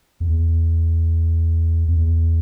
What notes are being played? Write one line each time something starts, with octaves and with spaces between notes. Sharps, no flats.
E2
E2